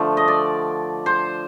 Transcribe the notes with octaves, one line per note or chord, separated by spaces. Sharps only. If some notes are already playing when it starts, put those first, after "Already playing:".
Already playing: D3 F3 A3
D#5
D5
C5